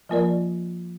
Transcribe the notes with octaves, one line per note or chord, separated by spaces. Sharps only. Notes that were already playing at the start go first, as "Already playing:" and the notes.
F3 A#3 F4 A#4 D5